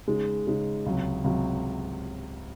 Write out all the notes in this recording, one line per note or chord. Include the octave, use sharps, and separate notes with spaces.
C#3 G#3 D#4
C#3 G#3 D#4
C#2 C3 F#3
C#2 C3 F#3